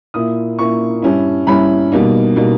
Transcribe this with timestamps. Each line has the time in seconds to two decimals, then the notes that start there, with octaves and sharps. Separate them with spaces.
0.14 A#2 A#3 E4 D#6
0.59 A#2 A#3 E4 C#6
1.02 G2 G3 C#4 E4
1.47 G2 G3 C#4 E4 B5
1.92 B2 G3 A#3 D#4
2.36 B2 G3 A#3 D#4